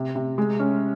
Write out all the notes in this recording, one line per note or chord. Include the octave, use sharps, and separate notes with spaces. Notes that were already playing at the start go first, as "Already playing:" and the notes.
Already playing: C3
C3
G#3
C#4